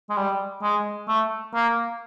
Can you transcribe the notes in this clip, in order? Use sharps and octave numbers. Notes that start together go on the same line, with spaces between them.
G#3
G3
G#3
A3
A#3